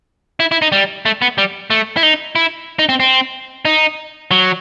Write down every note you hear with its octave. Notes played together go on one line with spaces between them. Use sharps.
E4
E4
D#4
G3
A3
B3
G3
A3
E4
D#4
E4
D#4
C4
C4
D#4
F#3